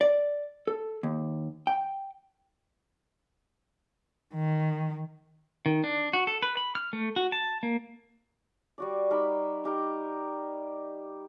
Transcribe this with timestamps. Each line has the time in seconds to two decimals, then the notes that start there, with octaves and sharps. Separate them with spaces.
0.01 D5
0.67 A4
1.03 D#2
1.67 G5
4.34 D#3
5.66 D#3
5.84 D4
6.13 F#4
6.27 A4
6.42 B4
6.57 B5
6.75 F6
6.93 A3
7.16 F#4
7.32 A5
7.63 A#3
8.78 G3 F#4 D5
9.10 G3 D#4 A#4 B5
9.64 D#4 G4 A#4 D#5